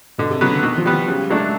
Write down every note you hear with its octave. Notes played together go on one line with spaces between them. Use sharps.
B2 D3
C3
C#3 F#3 B3
D3
B2 D#3
F3
G3 B3
F3
C#3 F#3
G3
F#3 G#3 A3 D4
G#3